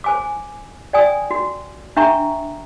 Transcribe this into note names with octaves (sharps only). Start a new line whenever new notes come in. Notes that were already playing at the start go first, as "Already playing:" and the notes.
C5 G#5 D6
D5 G5 G#5 D#6
F#4
D4 E5 G5 A#5 C#6